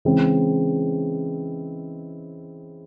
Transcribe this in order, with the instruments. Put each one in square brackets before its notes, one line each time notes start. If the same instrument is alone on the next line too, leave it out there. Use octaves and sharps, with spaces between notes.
[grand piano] C#3 E3 G#3 C4 E4